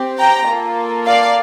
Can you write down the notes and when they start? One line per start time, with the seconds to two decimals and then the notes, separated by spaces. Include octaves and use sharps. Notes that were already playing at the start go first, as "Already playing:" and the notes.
Already playing: C4 G4
0.19 G5 A#5
0.48 A#3 F4 A4
1.07 D5 F5